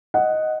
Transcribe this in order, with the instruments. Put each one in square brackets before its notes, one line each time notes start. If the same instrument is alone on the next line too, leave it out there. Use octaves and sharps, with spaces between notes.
[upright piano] D#5 F#5